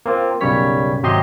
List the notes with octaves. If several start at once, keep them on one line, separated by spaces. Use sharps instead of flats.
A#3 C4 F4
B1 F#2 C#3 G3 C#5 B6
G#1 C3 F#3 G4 D#5 C6